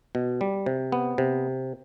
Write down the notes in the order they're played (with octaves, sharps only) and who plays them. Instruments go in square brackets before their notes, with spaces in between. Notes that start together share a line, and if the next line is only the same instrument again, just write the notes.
[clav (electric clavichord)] B2
G3
C3
B3
C3